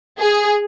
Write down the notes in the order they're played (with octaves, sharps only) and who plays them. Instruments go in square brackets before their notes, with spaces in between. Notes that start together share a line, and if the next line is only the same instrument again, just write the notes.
[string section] G#4